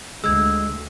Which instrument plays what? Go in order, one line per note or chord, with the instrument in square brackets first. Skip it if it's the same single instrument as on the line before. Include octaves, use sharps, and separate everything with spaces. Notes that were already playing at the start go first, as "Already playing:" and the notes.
[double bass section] D2 [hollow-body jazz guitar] G#3 [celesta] E6 G#6